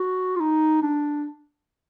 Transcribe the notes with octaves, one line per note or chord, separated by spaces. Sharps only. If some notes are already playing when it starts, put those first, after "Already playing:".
Already playing: F#4
F4
D#4
D4